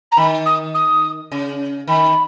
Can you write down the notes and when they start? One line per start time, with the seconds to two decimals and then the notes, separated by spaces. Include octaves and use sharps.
0.11 A#5
0.17 D#3 B5
0.46 D#6
0.74 D#6
1.32 C#3
1.88 D#3 B5